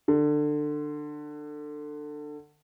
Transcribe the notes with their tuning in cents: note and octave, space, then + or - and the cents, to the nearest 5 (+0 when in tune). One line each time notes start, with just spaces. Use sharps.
D3 +20